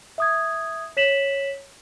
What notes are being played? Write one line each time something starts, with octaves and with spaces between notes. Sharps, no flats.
E5 D#6 G#6
C#5 B6 E7 F#7